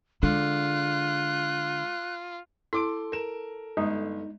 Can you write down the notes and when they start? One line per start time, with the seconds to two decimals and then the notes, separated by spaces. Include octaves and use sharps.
0.23 D3 G#3 F4 F#6
2.73 E4 A4 C6 D6 D7
3.12 A#4 E7
3.77 G1 G#3 D#4